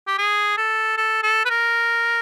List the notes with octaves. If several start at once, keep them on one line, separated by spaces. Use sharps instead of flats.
G4
G#4
A4
A4
A4
B4
A#4